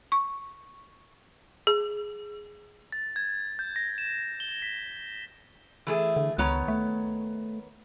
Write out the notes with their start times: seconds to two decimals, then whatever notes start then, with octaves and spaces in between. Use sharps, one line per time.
0.12 C#6
1.67 G#4
2.92 A6
3.16 G#6
3.59 G6
3.76 A#6
3.98 E7
4.40 G7
4.62 B6
5.87 E3 A3 G#4
6.16 D3
6.38 C#2 D#3 B3 C#5
6.68 A3